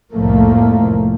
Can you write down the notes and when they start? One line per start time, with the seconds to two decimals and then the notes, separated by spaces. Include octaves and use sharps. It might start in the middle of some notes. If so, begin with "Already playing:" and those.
0.13 C2 F2 A2 F3 A3 A#3